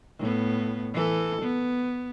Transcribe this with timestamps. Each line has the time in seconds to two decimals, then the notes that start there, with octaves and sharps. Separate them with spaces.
0.19 A2 B3
0.93 E3 A4
1.41 B3